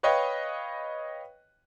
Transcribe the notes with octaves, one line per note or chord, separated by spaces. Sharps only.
B4 C#5 D#5 F5 G5